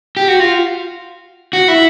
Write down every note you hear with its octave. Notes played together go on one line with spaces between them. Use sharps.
G4
F#4
F4
F#4
E4